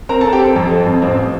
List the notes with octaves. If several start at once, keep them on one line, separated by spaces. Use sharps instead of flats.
C4 A#4 A#5
A4 A5
C4
G4 G5
C4 A4
F2 A4
C4
F2
A1 C4 C5